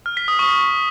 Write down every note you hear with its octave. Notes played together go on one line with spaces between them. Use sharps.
F6
B6
D#6
C#6